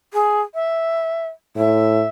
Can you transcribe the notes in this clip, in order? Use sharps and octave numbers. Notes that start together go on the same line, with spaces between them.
G#4
E5
A2 E5